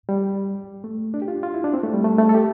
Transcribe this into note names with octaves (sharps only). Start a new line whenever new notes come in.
G3
A3
D4
G4
F4
F4
E4
D4
C4
A3
G3
A3
A3
A4
G4